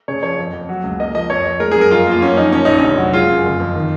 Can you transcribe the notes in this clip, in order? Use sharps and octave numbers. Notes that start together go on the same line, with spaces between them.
C#3 C#5
F3 C#5
F2
F2
F#3
C#2
A#3 D#5
F3 D#5
F2 C#5
F2
G#3 A#4
F#2 G#4
A#4
F2 F4
A#3 F4
F#2 C#4
F3 D#4
F3 C#4
A#1 D#4
C#4
F1
F#3
G#3 F4
F#2
F#1
F2
D#3